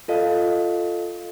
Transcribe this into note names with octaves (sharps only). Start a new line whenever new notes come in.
F4 A4 D#5 F5